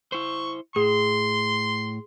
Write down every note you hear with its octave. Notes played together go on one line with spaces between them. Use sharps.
E4 C5 C#6
A2 G#4 C6